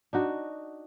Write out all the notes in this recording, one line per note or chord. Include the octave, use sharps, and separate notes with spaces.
D4 D#4 F#4